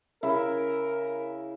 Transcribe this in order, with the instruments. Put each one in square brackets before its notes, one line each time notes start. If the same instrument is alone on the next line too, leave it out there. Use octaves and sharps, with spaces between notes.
[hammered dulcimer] C#3 E4 E5 [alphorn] A#4